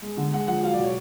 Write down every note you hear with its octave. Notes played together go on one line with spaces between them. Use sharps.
G#3
D3
G#3 F#5
F3 F#5
F#3 F5
D5
B2
C#5